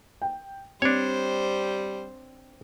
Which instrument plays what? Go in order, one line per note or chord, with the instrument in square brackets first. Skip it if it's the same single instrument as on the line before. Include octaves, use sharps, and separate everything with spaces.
[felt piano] G5
[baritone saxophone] G3 [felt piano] C4 [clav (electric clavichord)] D4 C#5 [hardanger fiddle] C5